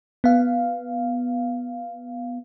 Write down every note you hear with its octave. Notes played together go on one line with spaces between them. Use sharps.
B3 F5